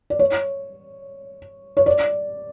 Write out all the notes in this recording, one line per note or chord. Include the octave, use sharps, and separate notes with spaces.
D5
C#5
C#5
D5